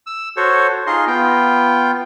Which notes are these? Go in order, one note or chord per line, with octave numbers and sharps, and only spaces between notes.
E6
F#4 A4 C5 C#5
D#4 F4 G#4 D#5 C6
B3 F4 G5